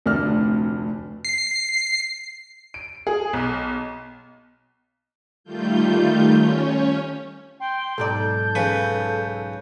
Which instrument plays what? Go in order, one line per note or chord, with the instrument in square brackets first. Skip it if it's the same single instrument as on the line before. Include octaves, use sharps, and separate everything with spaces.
[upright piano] F1 D2 D4 D5 F6
[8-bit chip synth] C7
[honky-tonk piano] D7
G#4
B1
[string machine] D#3 G3 A3 F4 G6
C#4 C#5
[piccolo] G5 [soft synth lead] C6
[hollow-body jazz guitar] B1 G#2 D5 [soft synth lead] A4 [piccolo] G6
[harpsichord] C#3 B4